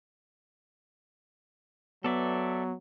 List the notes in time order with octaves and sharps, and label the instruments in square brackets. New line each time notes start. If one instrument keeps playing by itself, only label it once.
[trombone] F#3 [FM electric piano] B3 [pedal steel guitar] A4 D5 E5